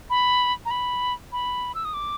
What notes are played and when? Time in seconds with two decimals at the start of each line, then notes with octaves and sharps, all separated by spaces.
0.10 B5
0.66 A#5
0.71 B5
1.32 B5
1.75 E6
1.85 D#6
1.94 D6